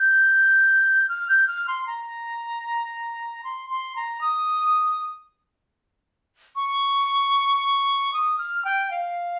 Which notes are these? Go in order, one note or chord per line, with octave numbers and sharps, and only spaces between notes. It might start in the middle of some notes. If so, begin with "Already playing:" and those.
Already playing: G6
F6
G6
F6
C6
A#5
C6
C6
A#5
D#6
C#6
D#6
F6
G5
F5